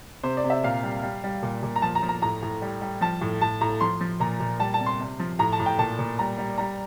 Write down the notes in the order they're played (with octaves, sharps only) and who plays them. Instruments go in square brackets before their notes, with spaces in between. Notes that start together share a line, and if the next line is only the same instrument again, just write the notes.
[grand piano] C3 C5
D5
C3
E5
A#2 F5
G3
G3
G3
A#2
A#2
A#5
F3 A5
A#5
F3
A#5
A2 A#5
A2
G3
G3
F3 A5
A2
A2 A5
A2 A#5
F3 C6
F3
A#2 A#5
A#2
G3 A5
A5
C3
C6
C3
F3
A2 A#5
A5
A2
G5
A#2 A5
A#2
G3 A#5
G3
G3 A#5